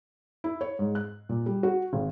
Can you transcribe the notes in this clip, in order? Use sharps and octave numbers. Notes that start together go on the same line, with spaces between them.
E4
C#5
G#2
F#6
A#2
G3
F#4
G#1